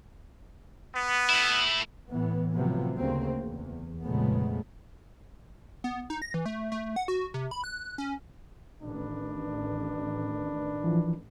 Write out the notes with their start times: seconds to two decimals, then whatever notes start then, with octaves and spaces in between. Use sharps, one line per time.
0.93 B3
1.29 A3 E4
2.10 A2 E3 B3
2.53 A2 C3 F3 F#3 B3
2.99 D2 C#3 A#3 C4
3.41 E2
4.03 F1 A#2 C#3 G#3 A3 B3
5.84 B3
6.10 D#4
6.22 A#6
6.34 E3
6.46 A3
6.72 A3
6.96 F#5
7.08 F#4
7.34 C3
7.51 B5
7.64 F#6
7.98 C#4
8.83 A1 D#3 D4 B4
10.84 E3 F3